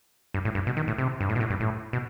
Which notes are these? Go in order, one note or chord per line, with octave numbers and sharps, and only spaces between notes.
G2
A2
G2
B2
D#3
A2
C3
G2
A2
B2
A2
G2
A2
B2